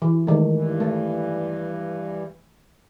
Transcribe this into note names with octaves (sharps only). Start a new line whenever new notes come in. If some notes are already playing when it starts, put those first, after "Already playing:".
E3
D#3 G#3 A3
G2 E3
A3